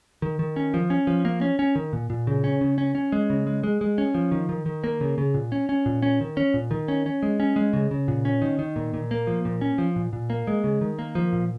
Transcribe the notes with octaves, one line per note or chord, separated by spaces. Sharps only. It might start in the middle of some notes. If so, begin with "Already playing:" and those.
D#3
D#3
C#4
F3
C#4
F3
A#3
C#4
C#4
D#3
A#2
A#2
C#3
C#4
C#3
C#4
C#4
G#3
C#3
G#3
G#3
G#3
C#4
F3
D#3
D#3
D#3
A#3
C#3
C#3
A#2
C#4
C#4
A#2
C#4
D#3
C#4
A#2
D#3
C#4
C#4
G#3
C#4
G#3
C#3
C#3
A#2
C#4
D#3
D#3
A#2
A#2
A#3
F3
A#2
C#4
F3
A#2
A#2
A#3
G#3
C#3
D#3
A#3
F3
A#2